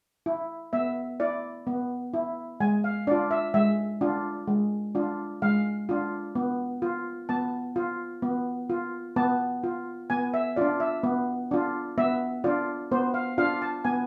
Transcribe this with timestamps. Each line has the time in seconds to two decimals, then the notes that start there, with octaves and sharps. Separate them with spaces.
0.26 E4
0.73 B3 E5
1.20 E4 D5
1.67 B3
2.14 E4
2.60 G#3 G#5
2.84 F5
3.07 D4 F4 D5
3.31 E5
3.54 G#3 E5
4.01 D4 F4
4.48 G#3
4.95 D4 F4
5.42 G#3 F5
5.89 D4 F4
6.35 B3
6.82 F4
7.29 B3 A5
7.76 F4
8.22 B3
8.70 F4
9.16 B3 A5
9.64 F4
10.10 B3 G#5
10.34 E5
10.56 D4 F4 D5
10.80 E5
11.03 B3
11.51 D4 F4
11.98 B3 E5
12.44 D4 F4 D5
12.92 B3 C5
13.14 F5
13.38 D4 F4 F5
13.62 A5
13.85 B3 G#5